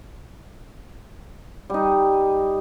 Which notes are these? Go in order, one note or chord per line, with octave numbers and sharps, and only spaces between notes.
G3 D#4